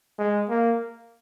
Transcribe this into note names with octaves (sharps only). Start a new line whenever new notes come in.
G#3
A#3